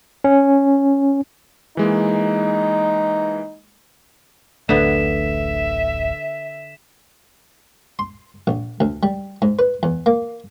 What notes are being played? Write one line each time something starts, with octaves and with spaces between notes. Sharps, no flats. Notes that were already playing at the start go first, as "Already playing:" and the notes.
C#4
E3 G#3 A#3 D#4
D1 A1 D3 A3 B3 E5 B6 E7
C6
A#1
D2
G3
G#2
B4
E2
A#3